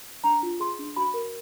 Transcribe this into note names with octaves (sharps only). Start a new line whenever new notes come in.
D4 A#5
F4
G#4 C6
D4
F#4 B5
A#4